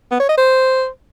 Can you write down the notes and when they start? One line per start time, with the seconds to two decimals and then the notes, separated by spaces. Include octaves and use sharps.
0.11 B3
0.20 C#5
0.29 D#5
0.37 C5